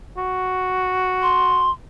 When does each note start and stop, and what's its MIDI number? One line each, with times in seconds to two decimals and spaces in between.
0.18 1.67 66
1.22 1.70 84